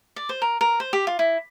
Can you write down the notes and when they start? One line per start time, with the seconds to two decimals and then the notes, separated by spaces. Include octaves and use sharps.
0.16 D5
0.29 C5
0.42 A#4
0.61 A#4
0.80 C5
0.93 G4
1.07 F4
1.19 E4